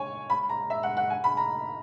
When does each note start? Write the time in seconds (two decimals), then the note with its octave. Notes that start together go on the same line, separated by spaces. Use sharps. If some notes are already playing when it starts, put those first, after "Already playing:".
Already playing: C#5 G#5
0.30 B5
0.49 A#5
0.70 E5
0.83 F#5
0.97 F#5
1.10 G#5
1.24 B5
1.37 A#5